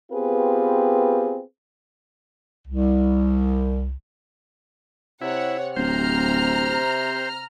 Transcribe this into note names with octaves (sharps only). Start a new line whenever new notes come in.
B3 C4 F4 G4 G#4 B4
C2
C3 E4 C#5 F#5
D1 C5 A#5 F6